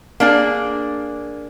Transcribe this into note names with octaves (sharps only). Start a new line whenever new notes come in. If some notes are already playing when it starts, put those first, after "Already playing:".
A#3 D4 G#4